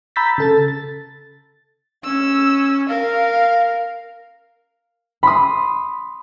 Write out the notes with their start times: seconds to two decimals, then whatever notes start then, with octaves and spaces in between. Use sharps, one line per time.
0.16 A#5 B5 E6 G6 A6 B6
0.38 C#3 A4 A6
0.68 A6
2.04 C#4 E6
2.89 A#4 F5
5.23 B5 C6 D#6